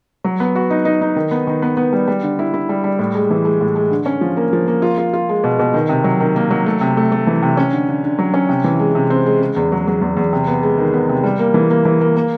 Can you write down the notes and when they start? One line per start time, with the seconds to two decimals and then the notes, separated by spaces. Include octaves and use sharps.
0.24 F#3
0.40 B3
0.55 F#4
0.70 D#4
0.85 D#4
1.01 D#4
1.16 D#3
1.31 B3
1.47 D#3
1.62 B3
1.77 B3
1.93 G3
2.08 G3
2.23 D3
2.39 E4
2.54 E4
2.69 G3
2.84 G3
2.99 A2
3.15 G#3
3.31 E3
3.45 G#3
3.61 A2
3.75 G#3
3.91 D3
4.06 C#4
4.21 F3
4.37 A#3
4.53 F3
4.68 A#3
4.82 F4
4.98 F4
5.13 F4
5.29 G#3
5.44 B2
5.59 B2
5.74 D#3
5.89 C3
6.04 F#3
6.20 D#3
6.36 A#3
6.51 F#3
6.66 A3
6.81 C3
6.97 A3
7.12 A3
7.27 E3
7.42 C3
7.57 C#4
7.73 D3
7.88 D3
8.04 D3
8.19 F#3
8.34 C#4
8.49 C3
8.64 E3
8.79 G#3
8.95 C3
9.10 C4
9.26 G#3
9.41 C#3
9.56 E2
9.72 F#3
9.87 F#3
10.02 E2
10.17 E2
10.33 C3
10.48 B3
10.63 G#3
10.78 D#3
10.94 B3
11.09 C3
11.24 G3
11.39 A#3
11.54 E3
11.70 A#3
11.85 E3
12.01 A#3
12.16 A#3